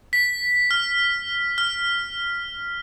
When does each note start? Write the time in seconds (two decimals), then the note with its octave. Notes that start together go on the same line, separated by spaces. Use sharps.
0.13 B6
0.71 F6
1.58 F6